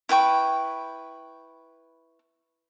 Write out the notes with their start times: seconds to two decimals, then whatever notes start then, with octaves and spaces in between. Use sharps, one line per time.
0.09 E4 B4 G5 C#6